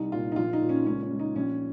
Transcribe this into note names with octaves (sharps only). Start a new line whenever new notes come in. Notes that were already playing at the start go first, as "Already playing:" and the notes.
Already playing: C2 D#4
A#2 F4
D#4
A#1 F4
D#4
A#2
C#4
C#2 C#4
C#4
C#2
D#4
A#1 C#4